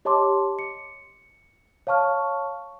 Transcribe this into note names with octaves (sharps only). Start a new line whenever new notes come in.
G4 C#5 D#5 A5 C6 D6
C#7
C#5 F5 A5 C#6 F6